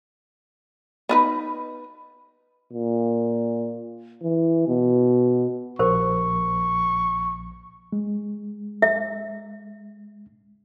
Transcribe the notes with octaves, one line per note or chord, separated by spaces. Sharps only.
B3 D#4 B4
A#2
E3
B2
A#1 G4 A#4 C5 C#6
G#3
E5